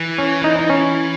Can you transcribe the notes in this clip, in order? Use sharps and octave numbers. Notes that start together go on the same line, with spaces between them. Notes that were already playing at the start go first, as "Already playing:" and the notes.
Already playing: E3
C#4
D#4
D#4
C#4